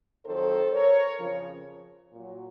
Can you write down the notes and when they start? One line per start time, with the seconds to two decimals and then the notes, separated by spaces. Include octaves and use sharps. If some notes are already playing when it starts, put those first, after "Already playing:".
0.25 F2 D#3 F#3 A4 C5
0.72 A#4 C#5
1.19 F2 C#3 F3
2.13 A#2 F#3